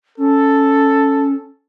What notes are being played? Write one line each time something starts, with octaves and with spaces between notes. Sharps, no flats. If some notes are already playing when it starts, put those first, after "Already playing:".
C#4 A4